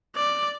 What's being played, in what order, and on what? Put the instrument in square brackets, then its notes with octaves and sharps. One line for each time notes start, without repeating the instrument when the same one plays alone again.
[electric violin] D5